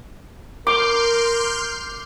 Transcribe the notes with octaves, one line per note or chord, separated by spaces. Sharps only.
A#4 C6 D6 F6 G6